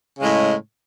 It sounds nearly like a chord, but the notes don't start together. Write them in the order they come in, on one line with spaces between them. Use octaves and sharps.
C#3 G#3 A2